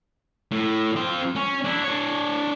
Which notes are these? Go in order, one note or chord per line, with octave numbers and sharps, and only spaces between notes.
A2
C4 F4
C#4
D4 E4
D4 C#5